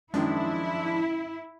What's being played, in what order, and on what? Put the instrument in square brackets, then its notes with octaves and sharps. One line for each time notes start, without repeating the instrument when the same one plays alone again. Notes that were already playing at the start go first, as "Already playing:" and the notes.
[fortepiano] F#2 D#3 [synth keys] F3 G#3 D4 [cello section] E4